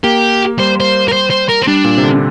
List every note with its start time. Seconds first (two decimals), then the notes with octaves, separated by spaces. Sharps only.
0.03 A#3 G4
0.58 G3 C5
0.80 C5
1.09 A#4
1.13 C5
1.30 C5
1.49 A#4
1.62 C4
1.67 G3 D4
1.84 A#2
1.97 C3
2.03 D3